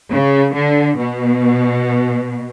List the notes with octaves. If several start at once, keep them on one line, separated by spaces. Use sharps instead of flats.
C#3
D3
B2